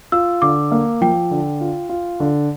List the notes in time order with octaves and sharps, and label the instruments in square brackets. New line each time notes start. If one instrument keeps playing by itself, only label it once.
[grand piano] F4 [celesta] E6
[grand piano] D3 [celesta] D6
[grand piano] A#3
[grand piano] F3 [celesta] G5
[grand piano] D3
F4
F4
D3